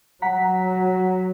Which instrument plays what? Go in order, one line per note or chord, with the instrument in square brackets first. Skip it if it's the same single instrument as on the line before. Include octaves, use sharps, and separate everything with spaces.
[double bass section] F#3 [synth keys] F#5 A#5 B6